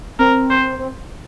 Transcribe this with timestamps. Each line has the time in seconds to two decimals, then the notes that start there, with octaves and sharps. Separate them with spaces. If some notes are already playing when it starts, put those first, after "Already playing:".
0.19 C4 A#4
0.50 C5
0.79 C4